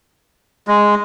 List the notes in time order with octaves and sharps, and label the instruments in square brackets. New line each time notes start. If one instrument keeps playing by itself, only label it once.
[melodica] G#3